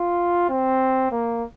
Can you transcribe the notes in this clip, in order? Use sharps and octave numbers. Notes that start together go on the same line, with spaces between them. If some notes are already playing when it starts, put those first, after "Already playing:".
Already playing: F4
C4
A#3